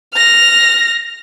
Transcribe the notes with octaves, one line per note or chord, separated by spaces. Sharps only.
F6 A#6